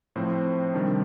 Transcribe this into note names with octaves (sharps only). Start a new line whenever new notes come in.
A2 F3 C4 C5
C3 D#3 G3 D4